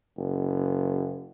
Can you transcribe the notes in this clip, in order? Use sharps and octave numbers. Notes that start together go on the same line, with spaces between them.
F#1